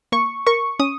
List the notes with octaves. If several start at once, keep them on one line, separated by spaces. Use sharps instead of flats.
A#3 C#6
A#4 C#6
C#4 D#6